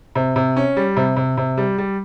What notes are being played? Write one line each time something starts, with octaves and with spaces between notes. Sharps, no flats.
C3
C3
C#4
G3
C3
C3
C3
G3
G3